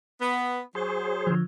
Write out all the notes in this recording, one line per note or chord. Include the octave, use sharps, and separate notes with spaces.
B3
F#3 G#4 C5
D3 F3